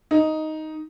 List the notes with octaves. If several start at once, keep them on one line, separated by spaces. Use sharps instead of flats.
D#4